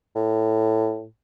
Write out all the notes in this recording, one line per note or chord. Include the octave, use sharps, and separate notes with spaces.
A2